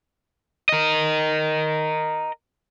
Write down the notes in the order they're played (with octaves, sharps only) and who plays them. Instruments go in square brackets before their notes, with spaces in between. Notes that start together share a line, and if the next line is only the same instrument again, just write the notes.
[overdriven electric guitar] A#4 D#5